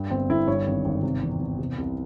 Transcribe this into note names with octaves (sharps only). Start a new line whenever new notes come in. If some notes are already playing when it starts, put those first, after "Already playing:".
Already playing: G2
G1 C4
G1 E4
G2 C#5
G#1
G#1
C3
E2
E2
C3
C2